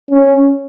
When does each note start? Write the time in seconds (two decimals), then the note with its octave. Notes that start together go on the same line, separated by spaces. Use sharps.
0.10 C#4